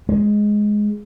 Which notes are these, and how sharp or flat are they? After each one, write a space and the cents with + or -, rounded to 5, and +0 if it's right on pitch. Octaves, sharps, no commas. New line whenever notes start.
G#3 +5